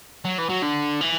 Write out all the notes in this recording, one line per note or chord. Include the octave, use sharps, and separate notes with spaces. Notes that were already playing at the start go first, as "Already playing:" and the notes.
F#3
E3
F#3
D3
E3